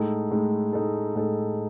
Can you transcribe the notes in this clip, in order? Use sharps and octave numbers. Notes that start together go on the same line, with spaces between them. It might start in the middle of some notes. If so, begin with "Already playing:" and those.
Already playing: A2 G#3 D#4 A4
A2 G#3 D#4 A4
A2 G#3 D#4 A4
A2 G#3 D#4 A4